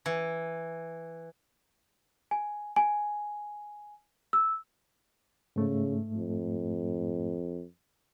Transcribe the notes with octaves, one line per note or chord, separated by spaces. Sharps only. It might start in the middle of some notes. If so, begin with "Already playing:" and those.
E3
G#5
G#5
E6
G#2 C#3 A3
F2